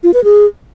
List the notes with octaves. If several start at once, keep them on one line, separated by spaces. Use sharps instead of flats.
F4
B4
G#4